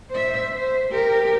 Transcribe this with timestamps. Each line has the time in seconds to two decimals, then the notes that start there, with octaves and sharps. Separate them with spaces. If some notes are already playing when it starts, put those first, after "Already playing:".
0.11 C5 E5
0.54 C5
0.92 G4 A#4